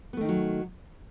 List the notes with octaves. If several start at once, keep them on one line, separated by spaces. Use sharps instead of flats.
D#3 F#3 A3 B3 D#4